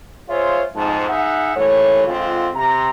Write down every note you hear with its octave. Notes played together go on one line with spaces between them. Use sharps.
F4 G#4 C5 C#5 E5 F5
F2 G#2 A5
D#4 G#4 E5 F#5
G2 A#2 E3 A3 C#5
D3 G#3 C4 F4
C3 A#5